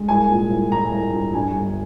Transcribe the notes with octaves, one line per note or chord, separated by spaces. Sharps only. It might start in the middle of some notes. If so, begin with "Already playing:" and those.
Already playing: G#3
C2 G#5
A#2
C2
C2 A#5
C2
G3
G2 G#5
G1